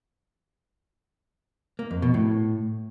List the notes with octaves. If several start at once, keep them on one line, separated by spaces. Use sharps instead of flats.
A#3
F2
B2
A2